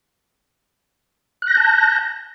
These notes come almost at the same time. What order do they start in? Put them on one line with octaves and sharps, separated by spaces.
F#6 A#6 G6 A5